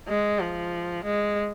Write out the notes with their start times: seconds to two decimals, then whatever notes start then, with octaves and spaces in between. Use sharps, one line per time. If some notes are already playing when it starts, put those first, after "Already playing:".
0.08 G#3
0.40 F3
1.05 G#3